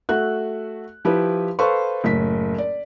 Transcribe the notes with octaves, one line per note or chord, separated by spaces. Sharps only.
A3 F#4 E5 F#6
F3 E4 G4 B4
A4 B4 C5 F5 C6 C#6
F#1 A2 B6
D5